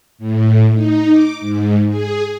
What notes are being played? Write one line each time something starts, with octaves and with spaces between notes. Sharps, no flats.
A2
D#4
D6
G#2
G#4